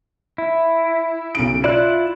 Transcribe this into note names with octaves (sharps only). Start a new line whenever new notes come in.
E4
B1 C#3 D7
E4 F4 D5 F#6